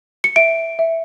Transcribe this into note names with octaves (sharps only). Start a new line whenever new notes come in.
C#7
E5 D7
E5